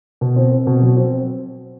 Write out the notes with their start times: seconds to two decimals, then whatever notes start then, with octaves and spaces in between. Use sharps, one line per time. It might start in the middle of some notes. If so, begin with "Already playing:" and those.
0.21 B2
0.36 C4
0.52 C4
0.67 B2
0.82 F#3
0.97 C4